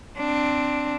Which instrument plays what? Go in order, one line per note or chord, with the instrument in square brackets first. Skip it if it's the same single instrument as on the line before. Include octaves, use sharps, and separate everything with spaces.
[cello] C4 D4